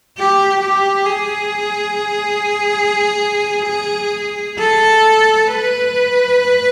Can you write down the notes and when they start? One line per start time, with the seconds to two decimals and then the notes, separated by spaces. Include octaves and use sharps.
0.19 G4
0.62 G4
1.06 G#4
4.59 A4
5.47 B4